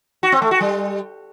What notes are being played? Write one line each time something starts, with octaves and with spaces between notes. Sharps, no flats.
F#4
C4
A3
F#4
G3